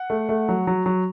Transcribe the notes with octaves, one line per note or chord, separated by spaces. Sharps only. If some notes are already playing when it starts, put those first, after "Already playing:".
Already playing: F#5
A3
A3
F#3
F#3
F#3